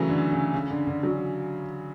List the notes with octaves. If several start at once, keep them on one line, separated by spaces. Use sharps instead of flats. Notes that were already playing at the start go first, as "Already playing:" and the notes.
Already playing: C#3 E3 F#3 A3
D3
C#3
C#3
D3
D3
D3 F#3